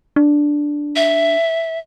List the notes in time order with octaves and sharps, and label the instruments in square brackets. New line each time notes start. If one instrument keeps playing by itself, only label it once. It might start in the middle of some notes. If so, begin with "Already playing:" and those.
[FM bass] D4
[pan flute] E5